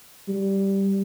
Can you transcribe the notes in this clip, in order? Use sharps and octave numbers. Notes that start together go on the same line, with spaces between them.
G3